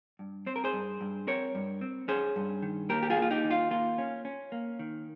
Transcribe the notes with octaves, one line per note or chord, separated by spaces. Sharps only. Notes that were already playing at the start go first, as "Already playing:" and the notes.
G2
C4 C5
A#4
G#4 C5
G2
G2
C4 A#4 C#5
G2
C4
C#4 G#4 C5
G2
D#3
A#3 G4 A#4
G4
F4 G#4
A#3
F4
D#4 G4
D#3
F4
A#3 F4
C#4
C#4
A#3
D#3